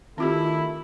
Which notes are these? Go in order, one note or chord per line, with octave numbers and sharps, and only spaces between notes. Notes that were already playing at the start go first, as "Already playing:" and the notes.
D#3 A3 C4 E4 F4 G4